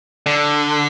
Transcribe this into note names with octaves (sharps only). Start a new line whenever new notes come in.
D3